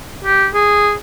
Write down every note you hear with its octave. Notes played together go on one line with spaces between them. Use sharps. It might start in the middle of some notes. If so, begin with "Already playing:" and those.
G4
G#4